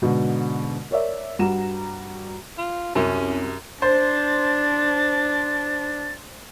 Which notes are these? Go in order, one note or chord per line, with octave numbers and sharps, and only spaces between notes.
G#2 B2 D3
A#4 C#5 D5 E5
G2 G3 F#4 A#5 E7
F4
C2 F#2 C#4 D#7
D4 C5 A6